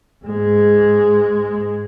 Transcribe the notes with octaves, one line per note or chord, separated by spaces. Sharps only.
G#2 G#3